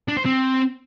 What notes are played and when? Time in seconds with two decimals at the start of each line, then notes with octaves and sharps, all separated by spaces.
0.08 D4
0.17 C5
0.25 C4